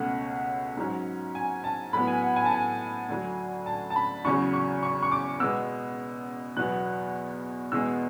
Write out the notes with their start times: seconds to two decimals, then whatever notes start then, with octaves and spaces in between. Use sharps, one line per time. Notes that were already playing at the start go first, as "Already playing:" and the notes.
Already playing: C#2 B2 A3 C#4 F#5
0.77 G#2 F#3 C#4
1.35 G#5
1.64 A5
1.93 A2 F#3 B3 B5
2.07 G#5
2.22 F#5
2.36 G#5
2.45 A5
2.51 G#5
3.09 D2 D3 F#3
3.66 A5
3.90 A5
3.96 B5
4.25 E2 C#3 F#3 C#4 C#6
4.53 C#6
4.83 C#6
5.03 C#6
5.12 D6
5.40 B2 G#3 B3 E6
6.56 E2 B2 F#3 B3 F#6
7.72 E2 B2 G#3 B3 E6